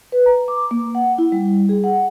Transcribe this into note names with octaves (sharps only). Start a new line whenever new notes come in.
B4
A#5
D6
A#3
F#5
E4
G3
G#4
F#5